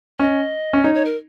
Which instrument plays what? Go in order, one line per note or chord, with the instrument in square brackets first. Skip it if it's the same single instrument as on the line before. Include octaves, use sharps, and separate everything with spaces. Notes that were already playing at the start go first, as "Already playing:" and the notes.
[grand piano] C#4 [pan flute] D#5
[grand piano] C#4
[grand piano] D#4 [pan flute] C#5
[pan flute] C#5
A#4